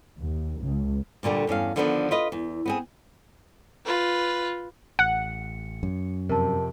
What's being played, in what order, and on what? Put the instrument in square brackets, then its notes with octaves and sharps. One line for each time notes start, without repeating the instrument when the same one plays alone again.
[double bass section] D#2
C#2
[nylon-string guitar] D2 A#2 D3 G3 D4
E2 G2 C#4 F5
D3 D#3 F3 B3 C#4 D4
F4 B4 D#5
E2
B3 C4 G#4
[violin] F4 B4
[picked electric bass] A1 [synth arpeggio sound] F#5 [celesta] C#7
[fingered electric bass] F#2
[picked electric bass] F2 C3 [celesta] A#4 A5